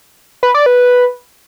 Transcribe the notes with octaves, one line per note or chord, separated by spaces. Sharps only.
B4
D5
B4